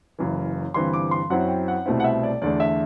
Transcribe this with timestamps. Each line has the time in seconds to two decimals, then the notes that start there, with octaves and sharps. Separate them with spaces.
0.19 F#1 F#2 E3
0.74 G1 G2 E3 G3 C4 C6
0.93 D6
1.11 C6
1.30 F#2 F#3 C4 E4 F#5
1.48 G5
1.68 F#5
1.86 C2 B2 A3 C4 E4
2.00 F#5
2.04 E5
2.23 D5
2.42 E2 D3 A3 D5
2.60 E5